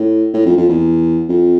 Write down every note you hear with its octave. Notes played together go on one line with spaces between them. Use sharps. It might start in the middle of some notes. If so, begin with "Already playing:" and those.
Already playing: A2
A2
F2
F2
E2
F2